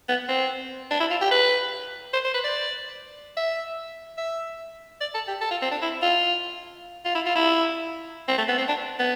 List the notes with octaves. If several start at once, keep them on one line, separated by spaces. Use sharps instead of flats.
B3
C4
D4
E4
F4
G4
B4
C5
C5
B4
D5
E5
E5
D5
A4
G4
A4
F4
C4
D4
E4
F4
F4
E4
F4
E4
C4
A3
B3
C4
D4
B3